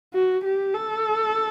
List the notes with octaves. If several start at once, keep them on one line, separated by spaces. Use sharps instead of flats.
F#4
G4
A4